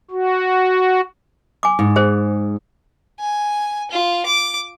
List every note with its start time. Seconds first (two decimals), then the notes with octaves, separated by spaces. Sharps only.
0.11 F#4
1.63 G#5 D6
1.79 G#2
1.96 G#4 C5
3.19 G#5
3.91 F4
4.26 D6